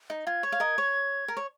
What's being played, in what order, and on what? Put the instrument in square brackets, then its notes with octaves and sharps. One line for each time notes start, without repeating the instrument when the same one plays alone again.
[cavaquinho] D#4
[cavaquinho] F4 [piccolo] G#6
[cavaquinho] C#5
F5
A#4 D#5
C#5
A#4
C#5